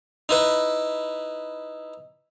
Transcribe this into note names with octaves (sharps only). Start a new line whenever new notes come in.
D#4 E4 B4